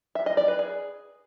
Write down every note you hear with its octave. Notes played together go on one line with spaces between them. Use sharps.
E5
D#5
D5
B4
G#4